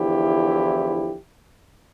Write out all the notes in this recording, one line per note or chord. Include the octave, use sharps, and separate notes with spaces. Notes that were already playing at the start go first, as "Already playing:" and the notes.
Already playing: E2 D3 F3 E4 G4